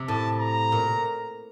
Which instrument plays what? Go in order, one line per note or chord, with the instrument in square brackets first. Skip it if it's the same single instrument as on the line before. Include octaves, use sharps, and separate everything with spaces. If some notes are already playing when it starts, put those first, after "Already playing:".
Already playing: [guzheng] C3
[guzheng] A2 [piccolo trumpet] A5
[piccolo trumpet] A#5
[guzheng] A#2